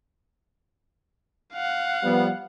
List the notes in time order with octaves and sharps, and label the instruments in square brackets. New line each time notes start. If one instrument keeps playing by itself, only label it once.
[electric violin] F5 F#5
[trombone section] F3 G3 B3